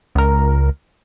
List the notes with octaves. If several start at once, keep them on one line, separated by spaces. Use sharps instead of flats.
C#2 A#4